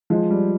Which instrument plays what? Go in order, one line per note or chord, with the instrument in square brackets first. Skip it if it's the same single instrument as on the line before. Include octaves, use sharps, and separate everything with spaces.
[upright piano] F3 G#3
G3